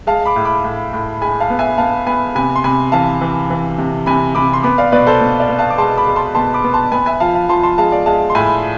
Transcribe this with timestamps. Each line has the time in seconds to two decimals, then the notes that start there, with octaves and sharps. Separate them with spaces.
0.07 G#3 F5 A5
0.26 B5 D6
0.36 A2
0.45 B5 D6
0.64 A2
0.93 A2
1.22 G#3 G#5 B5
1.40 F5 A5
1.50 B3
1.59 E5 G#5
1.78 B3 F5 A5
2.06 B3 G#5 B5
2.35 C3 G#5 B5
2.56 C6
2.64 C3 G#5 B5
2.92 E3 F5 A5
3.21 E3
3.50 E3
3.78 C3
4.06 C3 G#5 B5
4.35 C3 B5 D6
4.53 C6
4.63 B3 B5 D6
4.78 D5 F5
4.92 B2 B4 D5
5.07 A4 C5
5.21 B2
5.40 D5 F5
5.49 B3
5.59 F5 A5
5.70 D6
5.78 G#3 A5 C6
5.97 B5 D6
6.07 G#3
6.16 A5 C6
6.35 B2 A5 C6
6.54 B5 D6
6.64 B3
6.73 A5 C6
6.92 B3 G#5 B5
7.06 E5 G#5
7.20 F3 F5 A5
7.35 F5 A5
7.49 F3 A5 C6
7.63 A5 C6
7.78 G#3 F5 A5
7.92 D5 F5
8.06 G#3 F5 A5
8.30 C6
8.35 A2 G#5 B5